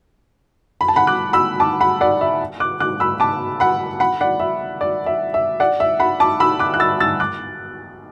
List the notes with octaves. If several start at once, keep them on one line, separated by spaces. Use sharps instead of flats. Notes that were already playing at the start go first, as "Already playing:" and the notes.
B5
A5
F#5 B5
D6 F#6
B5 E6
A5 D6
F#5 B5
D5 F#5
E5
D6 F#6
D6 F#6
B5 E6
A5 D6
F#5 B5
F#5 B5
D5 F#5
E5
D5
E5
E5
D5 F#5
E5
F#5 B5
A5 D6
B5 E6
D6 F#6
F#6
E6 A6
E6 A6
D6 F#6